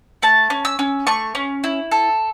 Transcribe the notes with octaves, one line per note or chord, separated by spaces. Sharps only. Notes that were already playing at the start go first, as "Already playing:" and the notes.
A3 A5
C#4
E6
C#4
A3 C#6
C#4
E4
A4